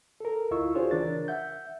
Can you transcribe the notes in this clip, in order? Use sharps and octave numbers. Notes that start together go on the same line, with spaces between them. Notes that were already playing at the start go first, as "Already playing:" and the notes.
A4 A#4
D2 E4 F4 D#5 C#6 E6
D4 F4 F#4 G#4 C5 C#5
C#3 E3 D4 A#4 A6
E5 F#5 G6